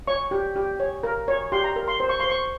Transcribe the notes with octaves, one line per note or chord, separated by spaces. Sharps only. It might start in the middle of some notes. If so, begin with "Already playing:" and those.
C#5 C#6
G4
G4
C#5
A#4
C#5
G4 C6
A#5
A#4
C6
C5
C#6
C5 C6
C#6